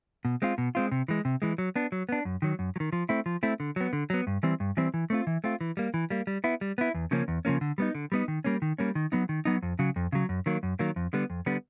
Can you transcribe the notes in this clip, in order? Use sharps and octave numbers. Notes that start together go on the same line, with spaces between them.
B2
G#3 C4 F4
B2
G#3 C4 F4
C3
E3 G#3
C3
E3 G#3
F#3
B3 D4
F#3
B3 D4
F#2
D#3 F#3
F#2
F#3
D#3
F3
A3 C4 E4
F3
A3 C4 E4
D3
F#3 B3
D3
F#3 B3
G2
E3 G3 C4
G2
E3 G3 C4
E3
A3 C4 F4
E3
A3 C4 F4
E3
G3 A#3
E3
G3 A#3
G3
B3 E4
G3
B3 E4
E2
C#3 F3 A#3 C#4
E2
C#3 F3 A#3 C#4
D3
G3 B3 D#4
D3
G3 B3 D#4
D#3
G3 A#3 C#4
D#3
G3 A#3 C#4
D#3
F#3 B3 D#4
D#3
F#3 B3 D#4
F2
C#3 F#3
F2
C#3 F#3
F#2
D#3 F#3 A#3
F#2
D#3 F#3 A#3
F2
D3 G3 B3
F2
D3 G3 B3